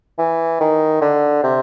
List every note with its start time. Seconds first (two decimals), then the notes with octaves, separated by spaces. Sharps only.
0.18 E3
0.60 D#3
1.01 D3
1.43 C3